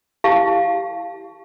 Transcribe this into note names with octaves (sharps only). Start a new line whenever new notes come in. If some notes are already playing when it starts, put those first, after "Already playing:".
E4 G4 F5 A5 C#6